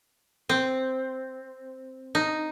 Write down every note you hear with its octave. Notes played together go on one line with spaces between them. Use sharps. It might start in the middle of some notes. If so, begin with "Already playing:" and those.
C4
D#4